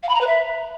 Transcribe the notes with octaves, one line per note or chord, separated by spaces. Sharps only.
F5
B5
A#5
B4
E5